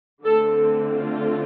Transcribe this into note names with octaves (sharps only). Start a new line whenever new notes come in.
D3 A3 C4 A4
A4
F4